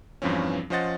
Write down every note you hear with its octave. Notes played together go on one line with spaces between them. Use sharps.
E2 G2 E3 F3 C4 C#4
F3 C#4 C5 D#5 F#5 A6